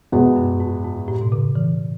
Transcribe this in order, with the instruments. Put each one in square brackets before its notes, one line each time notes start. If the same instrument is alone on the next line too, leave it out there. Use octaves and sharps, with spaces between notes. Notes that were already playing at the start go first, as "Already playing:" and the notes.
[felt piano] E2 B2 G#3 B3 [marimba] G#2
[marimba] F#2
G#2
G#2
A2
B2
C#3
E3